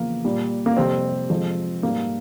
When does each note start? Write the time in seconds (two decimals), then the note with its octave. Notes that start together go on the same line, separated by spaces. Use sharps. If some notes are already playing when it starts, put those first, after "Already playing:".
Already playing: E2 C#3 F3 A#3
0.24 A#2 G3
0.66 A#3
0.77 F2 C3 G3 C4
1.30 F2 C3 F3 G#3
1.82 G#2 G3 A#3